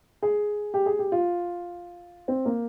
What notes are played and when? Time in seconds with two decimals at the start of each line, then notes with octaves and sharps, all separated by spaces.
0.22 G#4
0.74 G4
0.86 G#4
0.99 G4
1.12 F4
2.28 C4
2.45 A#3